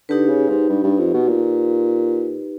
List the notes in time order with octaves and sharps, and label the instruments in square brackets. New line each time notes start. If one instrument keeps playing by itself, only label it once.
[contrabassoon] D3 [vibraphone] D#4 G4 B4
[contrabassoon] C#3
G#2
G2
G2
F2
B2
A#2